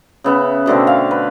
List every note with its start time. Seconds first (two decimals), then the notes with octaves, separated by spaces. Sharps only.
0.24 C#3 B3 E5
0.66 B2 D3 A3 C4
0.87 F5
1.11 B4